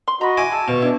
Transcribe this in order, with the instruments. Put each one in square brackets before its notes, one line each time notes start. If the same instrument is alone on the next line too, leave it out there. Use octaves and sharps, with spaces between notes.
[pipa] C6
[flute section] F#4 D#5 C#6 [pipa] A#5 B5
[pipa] E4 [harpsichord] G#5 D6
[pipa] G#4 [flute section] A5 E6
[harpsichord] B2 [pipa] F4 [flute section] C#6
[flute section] D4 [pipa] E4